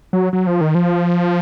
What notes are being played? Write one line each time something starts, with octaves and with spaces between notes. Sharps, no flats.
F#3
F#3
F3
D#3
F3